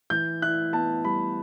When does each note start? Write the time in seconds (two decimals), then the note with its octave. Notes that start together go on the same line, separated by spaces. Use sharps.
0.10 E3 G6
0.42 E4 F#6
0.73 B3 A5
1.05 G3 B5